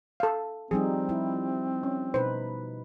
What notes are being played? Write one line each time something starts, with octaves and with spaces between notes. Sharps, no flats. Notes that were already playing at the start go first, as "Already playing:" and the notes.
A4 F5
F3 G3 C4 D#4 G#4
E4
C#4
B2 D#4 B4 C5